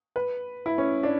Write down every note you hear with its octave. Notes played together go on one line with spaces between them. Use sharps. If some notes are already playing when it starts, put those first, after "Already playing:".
B4
E4
C#4
D4